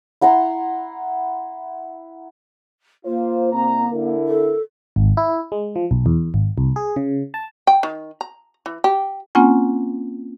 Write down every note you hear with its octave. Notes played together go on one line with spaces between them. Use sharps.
E4 F#5 A#5 C6
A#3 F4 C5
C2 C4 A#5
D3 E4 A#4
A4
G#1
E4
G#3
F3
B1
E2
G#1
C2
G#4
C#3
A5
G5
D#3
A#5
E3
G4
A#3 C4 C#4 F4 F#5 G#5